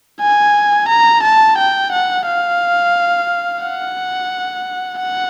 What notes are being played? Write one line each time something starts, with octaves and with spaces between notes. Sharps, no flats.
G#5
A#5
A5
G5
F#5
F5
F#5
F#5